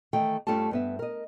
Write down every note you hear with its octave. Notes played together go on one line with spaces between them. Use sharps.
D#3 E3 A3 G5
G2 A3 C#4 F4 G4 A5
G2 B3 E5
A#4 D#5